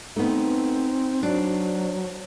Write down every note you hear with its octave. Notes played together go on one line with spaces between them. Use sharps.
A3 B3 C4 D#4
F#3 D4 F#4 C5 D5